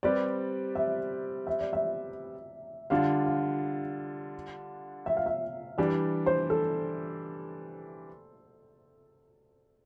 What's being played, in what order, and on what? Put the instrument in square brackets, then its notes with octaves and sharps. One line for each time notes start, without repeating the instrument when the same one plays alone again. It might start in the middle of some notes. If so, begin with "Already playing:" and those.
[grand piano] G3 C4 G4 B4 [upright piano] D5
[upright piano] E5
E5
D5
E5
[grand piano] D3 G3 D4 F4 [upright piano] F5
[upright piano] F5
E5
F5
E5
[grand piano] E3 G3 D4 G4 [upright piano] D5
[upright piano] C5
A4